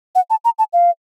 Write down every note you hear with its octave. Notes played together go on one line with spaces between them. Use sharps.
F#5
A5
A#5
A5
F5